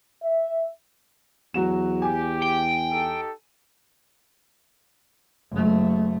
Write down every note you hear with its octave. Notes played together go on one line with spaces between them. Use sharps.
E5
E2 F#3 F#4 E7
G4 G#5
G5
D#4 G4 A4
F#1 A3